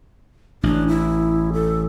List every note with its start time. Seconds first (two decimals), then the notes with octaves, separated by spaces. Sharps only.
0.63 A1 D4
0.88 E4
1.53 A4